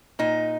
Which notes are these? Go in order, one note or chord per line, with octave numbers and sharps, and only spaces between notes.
A#2 D#4